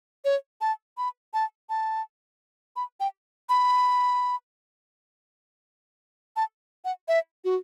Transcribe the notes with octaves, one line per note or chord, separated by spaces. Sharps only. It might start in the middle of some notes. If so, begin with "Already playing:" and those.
C#5
A5
B5
A5
A5
B5
G5
B5
A5
F#5
E5
F#4